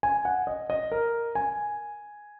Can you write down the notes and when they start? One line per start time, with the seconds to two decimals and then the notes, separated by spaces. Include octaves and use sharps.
0.03 G#5
0.25 F#5
0.47 D#5
0.70 D#5
0.92 A#4
1.35 G#5